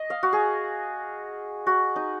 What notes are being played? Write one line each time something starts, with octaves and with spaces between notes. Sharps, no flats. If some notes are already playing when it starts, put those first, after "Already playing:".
Already playing: D#5
F5
F#4
G#4
F#4
D#4